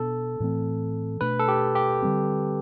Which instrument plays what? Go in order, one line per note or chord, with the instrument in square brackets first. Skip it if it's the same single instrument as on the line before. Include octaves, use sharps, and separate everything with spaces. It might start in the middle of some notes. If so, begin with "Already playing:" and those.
Already playing: [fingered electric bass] B2 B3 D4 [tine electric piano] A4
[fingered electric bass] A2 E3 A3 C4
[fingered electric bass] B2 A3 D4 [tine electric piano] B4
[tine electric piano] A4
G4
G4
[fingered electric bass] D3 G3 C4